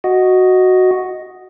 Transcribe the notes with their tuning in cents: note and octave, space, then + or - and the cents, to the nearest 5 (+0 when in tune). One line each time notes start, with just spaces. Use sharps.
F#4 +0 D#5 +0